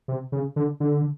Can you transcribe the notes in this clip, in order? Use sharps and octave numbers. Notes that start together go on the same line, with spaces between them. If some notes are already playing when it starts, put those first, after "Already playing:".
C3
C#3
D3
D3